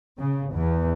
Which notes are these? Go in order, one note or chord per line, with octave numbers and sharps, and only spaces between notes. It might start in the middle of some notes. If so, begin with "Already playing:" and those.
C#3
E2